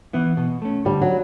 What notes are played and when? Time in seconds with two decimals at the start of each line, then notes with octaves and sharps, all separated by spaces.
0.13 E3 B3 E4
0.37 B2
0.62 A3 C#4
0.85 D3 G3
1.02 F#3